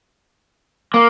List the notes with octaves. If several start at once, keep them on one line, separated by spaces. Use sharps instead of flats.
A#3